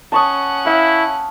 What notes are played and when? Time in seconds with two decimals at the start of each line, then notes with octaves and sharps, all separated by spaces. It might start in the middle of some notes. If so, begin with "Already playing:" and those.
0.12 C#4 F#5 A5 C#6 D#6
0.66 E4 F5